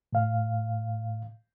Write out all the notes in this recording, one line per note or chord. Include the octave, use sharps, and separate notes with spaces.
A2 F5